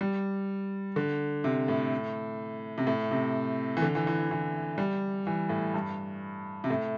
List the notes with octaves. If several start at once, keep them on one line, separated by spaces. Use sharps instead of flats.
G3
D3
C3
A2
C3
A2
C3
E3
D3
E3
E3
E3
G3
E3
A2
G2
C3
A2